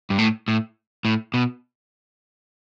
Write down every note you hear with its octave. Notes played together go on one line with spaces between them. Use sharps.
G2
A2
A2
A2
B2